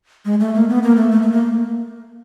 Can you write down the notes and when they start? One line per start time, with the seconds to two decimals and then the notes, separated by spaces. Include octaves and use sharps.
0.25 G#3
0.40 A3
0.55 A#3
0.69 B3
0.83 A#3
0.96 A3
1.11 A3
1.22 A3
1.32 A#3